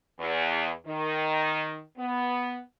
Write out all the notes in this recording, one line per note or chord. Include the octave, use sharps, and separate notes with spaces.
E2
D#3
B3